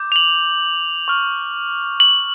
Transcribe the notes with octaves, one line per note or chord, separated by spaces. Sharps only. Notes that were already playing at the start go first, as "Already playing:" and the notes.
Already playing: D6 G6
F7
F#7
C#6 F6
F#7